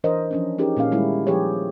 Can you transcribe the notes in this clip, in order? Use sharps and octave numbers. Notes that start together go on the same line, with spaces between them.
E3 D4 A#4 C5 D#5
F3 C#4 D4
C#4 D#4 G4 G#4 A#4 B4
A#2 A#3 C#4 F5
D#3 G3 G#3 E4
F3 F#3 G4 G#4 B4 C#5